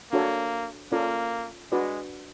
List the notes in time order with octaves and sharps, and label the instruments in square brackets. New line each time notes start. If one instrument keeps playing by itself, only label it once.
[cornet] A#3 [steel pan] D4 F#4 A4 C#5
[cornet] A#3 [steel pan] C#4 F4 A4 D5
[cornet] G#3 [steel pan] D4 F#4 B4 D5